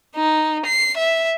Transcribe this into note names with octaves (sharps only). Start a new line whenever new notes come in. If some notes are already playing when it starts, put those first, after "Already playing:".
D#4
C7
E5